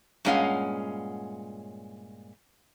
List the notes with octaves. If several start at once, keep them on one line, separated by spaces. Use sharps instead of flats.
G2 A#2 G#3 C#4 F5 F#5